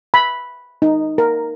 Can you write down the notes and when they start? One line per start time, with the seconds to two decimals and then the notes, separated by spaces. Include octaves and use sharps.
0.14 B5
0.82 D#4
1.18 A#4